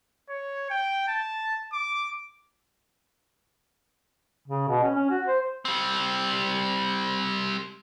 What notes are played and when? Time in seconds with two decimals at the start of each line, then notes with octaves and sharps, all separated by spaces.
0.29 C#5
0.70 G5
1.08 A5
1.73 D6
4.48 C#3
4.69 B2
4.83 C#4
4.95 C#4
5.10 F#4
5.27 C5
5.65 G3 C4